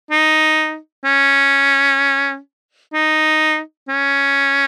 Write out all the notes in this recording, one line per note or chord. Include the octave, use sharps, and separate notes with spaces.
D#4
C#4
D#4
C#4